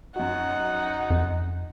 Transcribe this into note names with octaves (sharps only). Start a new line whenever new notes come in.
F#2 D#4 F#4 F#5
F2